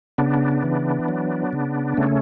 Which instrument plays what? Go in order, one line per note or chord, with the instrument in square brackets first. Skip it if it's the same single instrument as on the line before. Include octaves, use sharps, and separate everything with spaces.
[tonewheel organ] C#3 B3 D4
E3
F#3
C#3
C#3 A3 C#4